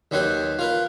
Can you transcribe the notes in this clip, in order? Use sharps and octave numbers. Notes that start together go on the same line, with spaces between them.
D#2 D#3 F#3 B4 C5
F4 A#4 B4